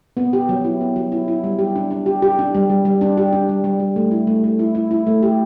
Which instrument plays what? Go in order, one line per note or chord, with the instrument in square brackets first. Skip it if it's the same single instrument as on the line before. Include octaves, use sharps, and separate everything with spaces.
[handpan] B3
G4
F#3
E4
B3
F#3
E4
E4
G3
G4
D4
D4
G4
G4
D4
G3
G3
G3
D4
G4
D4
G3
G3
G3
A3
E4
A3
A3
E4
E4
E4
A3
G4